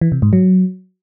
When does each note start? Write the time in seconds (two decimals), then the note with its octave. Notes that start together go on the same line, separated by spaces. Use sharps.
0.01 E3
0.12 C3
0.22 G#2
0.33 F#3